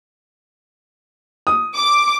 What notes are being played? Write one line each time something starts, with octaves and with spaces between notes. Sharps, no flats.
D#6
D6